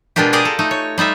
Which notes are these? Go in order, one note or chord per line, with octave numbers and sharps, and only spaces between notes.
B2 G#3 A#3 D4 F4 G4
G4 G#4 A#4 D5 D#5
A4
A3 D#4
C#5
G3 D#4 F4 E5